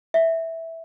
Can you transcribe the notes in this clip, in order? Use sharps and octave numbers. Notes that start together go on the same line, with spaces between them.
E5